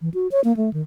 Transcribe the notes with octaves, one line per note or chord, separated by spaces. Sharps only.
E3
F#4
C#5
A#3
A3
D#3